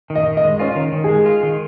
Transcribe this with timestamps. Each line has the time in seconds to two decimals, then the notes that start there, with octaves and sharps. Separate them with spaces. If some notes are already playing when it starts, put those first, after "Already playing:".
0.10 D#3
0.15 D#5
0.27 D#3
0.37 D#5
0.44 G#3
0.59 C#4 F4
0.76 D#3
0.92 D#3
1.04 G#4
1.09 G#3
1.26 F4
1.43 D#3